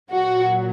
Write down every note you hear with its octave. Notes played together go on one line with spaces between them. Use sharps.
A#2 F#3 F#4